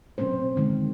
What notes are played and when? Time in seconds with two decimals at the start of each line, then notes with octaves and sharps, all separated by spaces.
0.18 B2 F#3 C4 C#4 C5
0.56 D3 D#3 G#3